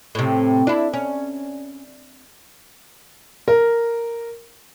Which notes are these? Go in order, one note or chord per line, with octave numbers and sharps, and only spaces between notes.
A2 C3
D4 E4
C#4
A#4